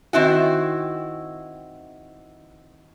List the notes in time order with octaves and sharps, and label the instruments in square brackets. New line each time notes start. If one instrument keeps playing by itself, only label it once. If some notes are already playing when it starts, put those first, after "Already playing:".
[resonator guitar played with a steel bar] D#3 C4 E4 F#4